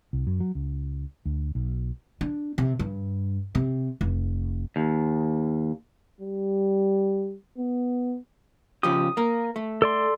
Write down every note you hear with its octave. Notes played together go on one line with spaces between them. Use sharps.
C2
F#2
F#3
C#2
D2
B1
D4
C3
G2
C3
F1
D#2
G3
B3
C#3 F3 G4 D#6
A#3 A#4
A3
A4 D5 C6